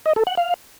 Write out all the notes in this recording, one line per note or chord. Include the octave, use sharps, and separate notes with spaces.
D#5
A4
F#5
F5